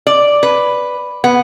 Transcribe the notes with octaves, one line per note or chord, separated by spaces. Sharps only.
D5
B4
B3